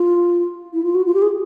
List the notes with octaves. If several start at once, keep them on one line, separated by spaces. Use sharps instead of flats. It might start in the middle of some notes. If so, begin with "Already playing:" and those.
Already playing: F4
E4
F4
F#4
F4
G4
G#4